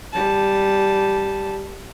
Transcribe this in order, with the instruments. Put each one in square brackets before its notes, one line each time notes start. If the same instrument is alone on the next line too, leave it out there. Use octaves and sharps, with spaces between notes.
[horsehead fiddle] G3 A5